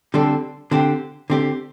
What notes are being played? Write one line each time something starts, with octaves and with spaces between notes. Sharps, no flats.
D3 G3 C4 A4
D3 C4 G4
D3 C4 G4